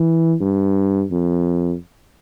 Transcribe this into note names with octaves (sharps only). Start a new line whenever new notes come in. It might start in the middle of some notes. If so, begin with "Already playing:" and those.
Already playing: E3
G2
F2